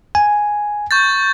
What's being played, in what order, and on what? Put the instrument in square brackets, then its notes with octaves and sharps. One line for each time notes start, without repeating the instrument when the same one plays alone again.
[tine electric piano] G#5
[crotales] C#6 G6 A6